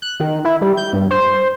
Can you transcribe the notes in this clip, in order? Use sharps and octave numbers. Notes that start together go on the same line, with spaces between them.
F#6
D#3
E4
G3
G6
G2
C5